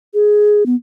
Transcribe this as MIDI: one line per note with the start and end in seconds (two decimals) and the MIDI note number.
0.14 0.66 68
0.66 0.75 59